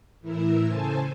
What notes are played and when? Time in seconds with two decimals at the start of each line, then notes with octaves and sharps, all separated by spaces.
0.21 A2 E3 E4 A#4 E6
0.65 C#3 A4 C5 G#5 A5